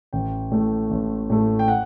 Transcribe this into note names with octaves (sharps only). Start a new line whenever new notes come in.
A1 G5
A2 A3
A1
A2 A3
G5
F#5